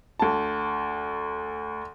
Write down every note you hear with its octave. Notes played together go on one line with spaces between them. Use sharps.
D2 A5